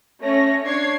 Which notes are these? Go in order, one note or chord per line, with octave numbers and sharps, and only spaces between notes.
A3 C#4 C#5 A#6
D4 C#5 G#6 C7